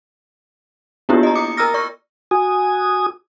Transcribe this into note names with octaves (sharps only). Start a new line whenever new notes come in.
A#3 B3 D4 E4 F4 G4
D#5 A#5
D6 D#6 C#7
A#4 A#5 E6 F6 A#6
D5 C#6
F#4 G#5 D#6